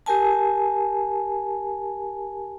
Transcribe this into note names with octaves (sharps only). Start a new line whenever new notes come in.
G4 A#4 G#5 A5